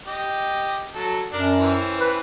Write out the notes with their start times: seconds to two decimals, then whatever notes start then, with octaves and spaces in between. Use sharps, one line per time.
0.07 G4 D#5
0.95 F#3 A4
1.33 F#2 D4 A#4
1.59 E3 C4 C#4
2.01 B4